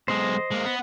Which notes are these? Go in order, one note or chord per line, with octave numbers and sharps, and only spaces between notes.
B1 G#3 C5 D#5
G#3 A#3
B3